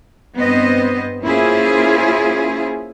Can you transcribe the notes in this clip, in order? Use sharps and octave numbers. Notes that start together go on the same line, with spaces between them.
G2 B3 C4 C5 D#5
A#3 C#4 E4 F4 G#4 C5